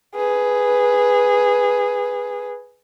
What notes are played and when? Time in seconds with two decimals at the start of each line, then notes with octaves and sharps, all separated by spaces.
0.16 G#4 B4